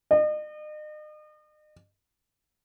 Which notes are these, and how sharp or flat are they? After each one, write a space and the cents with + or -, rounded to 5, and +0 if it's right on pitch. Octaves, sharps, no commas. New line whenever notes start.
D#5 -40